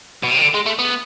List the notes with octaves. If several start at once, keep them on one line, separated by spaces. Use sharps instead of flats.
B2
C3
D#3
D3
G#3
A3
B3